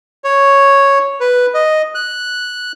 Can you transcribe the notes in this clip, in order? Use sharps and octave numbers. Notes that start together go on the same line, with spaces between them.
C#5
B4
D#5
F#6